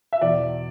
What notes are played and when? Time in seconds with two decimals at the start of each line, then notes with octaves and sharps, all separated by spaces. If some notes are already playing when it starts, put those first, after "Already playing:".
0.13 E5
0.21 E2 B2 D5